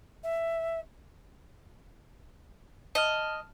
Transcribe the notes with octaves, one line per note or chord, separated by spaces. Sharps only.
E5
D#5 A5 F6